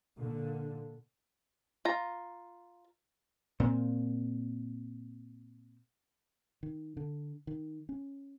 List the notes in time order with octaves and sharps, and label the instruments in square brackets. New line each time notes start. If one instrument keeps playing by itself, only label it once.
[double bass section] A#2 D3
[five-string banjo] F4 A#5
[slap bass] A#2 C4
[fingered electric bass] D#3
D3
D#3
C#4